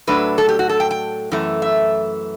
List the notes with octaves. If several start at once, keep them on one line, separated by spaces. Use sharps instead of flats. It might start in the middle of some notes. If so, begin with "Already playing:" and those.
A2 F#3 A3 D4 B4
A4
G4
F#4
A4
G5
G5
F#2 E3 A3
E5